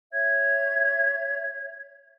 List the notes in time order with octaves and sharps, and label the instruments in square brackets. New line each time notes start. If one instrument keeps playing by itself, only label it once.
[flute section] C#5 E5 G#6